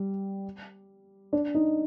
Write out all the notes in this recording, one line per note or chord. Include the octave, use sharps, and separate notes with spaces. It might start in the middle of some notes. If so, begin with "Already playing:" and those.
Already playing: G3
D4
D#4